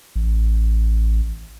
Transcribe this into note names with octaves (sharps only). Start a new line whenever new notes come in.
A1